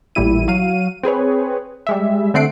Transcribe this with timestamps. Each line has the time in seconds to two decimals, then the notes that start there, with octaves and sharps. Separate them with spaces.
0.15 A1 A#2 G3 E4 D#7
0.48 F#3 F5 D#7
1.03 C4 G#4 B4 C#5
1.87 G3 G#3 E5
2.34 D3 A3 C4 F#5 C7 D7